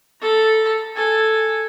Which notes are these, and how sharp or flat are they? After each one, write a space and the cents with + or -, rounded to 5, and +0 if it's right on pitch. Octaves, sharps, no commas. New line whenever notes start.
A4 +0 A#5 +30
A4 +0 G#5 +0